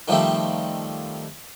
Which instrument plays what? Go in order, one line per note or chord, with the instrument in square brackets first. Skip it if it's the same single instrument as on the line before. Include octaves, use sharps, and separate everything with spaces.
[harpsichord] D#3 F3 G3 A3 C4